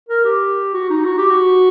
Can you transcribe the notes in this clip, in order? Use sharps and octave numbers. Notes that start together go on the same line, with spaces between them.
A#4
G4
F#4
D#4
F#4
G4
F#4